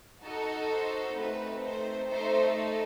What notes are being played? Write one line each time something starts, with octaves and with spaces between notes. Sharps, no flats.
D#4 F#4 A4 D#5
C5
A3 C4 D#4 B4
C5
A3 D#4 A4 C5